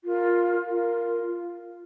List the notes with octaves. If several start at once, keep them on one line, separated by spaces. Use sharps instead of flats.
F4 A#4
F4 A#4